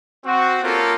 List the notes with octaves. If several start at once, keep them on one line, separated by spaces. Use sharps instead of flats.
C4 F#4
A#3 C#4 F4 G4 A4 A#4